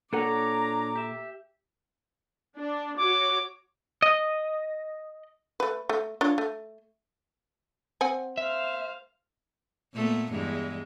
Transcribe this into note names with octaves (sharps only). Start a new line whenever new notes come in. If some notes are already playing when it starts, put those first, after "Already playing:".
A#2 D4 A4 C#5 F#5 A#5 D6
G4 E5
D4
F#4 C#5 D6
D#5
A3 B4
A3
D4 F4 C#5
A3
C4 F#5 G#5
C5 E5 F5
A#2 A3 B3
E2 G2 G#3